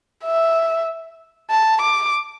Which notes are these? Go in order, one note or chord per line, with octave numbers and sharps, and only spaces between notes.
E5
A5
D6